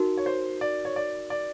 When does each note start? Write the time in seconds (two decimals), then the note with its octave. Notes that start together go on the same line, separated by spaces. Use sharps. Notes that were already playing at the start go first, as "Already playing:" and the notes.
Already playing: D#4 F#4 A#4
0.17 C#5
0.26 C5
0.61 D5
0.85 C#5
0.96 D5
1.30 D5